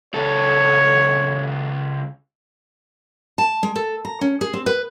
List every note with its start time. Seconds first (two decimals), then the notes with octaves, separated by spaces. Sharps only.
0.14 C#2 A4 C#5
3.38 A5
3.63 G#3
3.76 A4
4.05 A#5
4.21 C#4
4.41 G#4
4.53 C4
4.66 B4